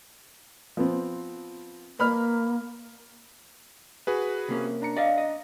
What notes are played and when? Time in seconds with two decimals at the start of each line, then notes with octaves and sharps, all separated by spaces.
0.77 F3 B3 C4
1.99 A#3 B4 B5 F6
4.07 F#4 G#4 B4
4.48 C3 A#3 C#4
4.82 D4 A#5 C#7
4.97 D5 D#5 F5
5.18 D#5